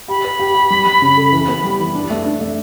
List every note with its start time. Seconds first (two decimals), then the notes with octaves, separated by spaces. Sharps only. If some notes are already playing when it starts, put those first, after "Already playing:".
0.08 G4 B5
0.25 B4
0.40 G4
0.55 G4
0.70 G3
0.86 G3
1.02 C#3
1.17 A4
1.32 E3
1.48 B3
1.63 G3
1.80 E3
1.95 D4
2.10 A3
2.25 D4
2.41 A3